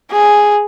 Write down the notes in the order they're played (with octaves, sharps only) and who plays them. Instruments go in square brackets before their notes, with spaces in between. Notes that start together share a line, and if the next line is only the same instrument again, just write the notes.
[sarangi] G#4